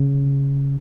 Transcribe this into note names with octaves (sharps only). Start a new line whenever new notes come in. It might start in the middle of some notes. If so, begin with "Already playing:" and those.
Already playing: C#3